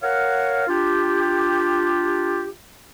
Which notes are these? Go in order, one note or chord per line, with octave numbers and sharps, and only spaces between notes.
A#4 C#5 F5 F#5
D4 F4 G4